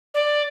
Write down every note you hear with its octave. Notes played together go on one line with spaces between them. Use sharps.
D5